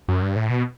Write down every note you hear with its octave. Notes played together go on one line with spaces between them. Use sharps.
F#2
G2
A2
B2